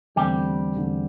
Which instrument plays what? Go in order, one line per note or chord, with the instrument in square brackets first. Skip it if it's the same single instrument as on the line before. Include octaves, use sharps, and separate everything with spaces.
[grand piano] E2 D3 A3 C4 [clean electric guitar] G3 G4
[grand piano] E2 D3 A3 C4